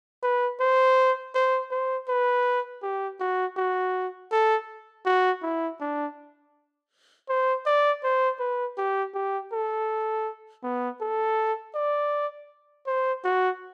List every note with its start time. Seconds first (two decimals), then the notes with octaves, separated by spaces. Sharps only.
0.22 B4
0.60 C5
1.34 C5
1.71 C5
2.08 B4
2.82 G4
3.20 F#4
3.57 F#4
4.32 A4
5.06 F#4
5.42 E4
5.80 D4
7.29 C5
7.66 D5
8.04 C5
8.40 B4
8.78 G4
9.14 G4
9.52 A4
10.63 B3
11.01 A4
11.75 D5
12.86 C5
13.24 F#4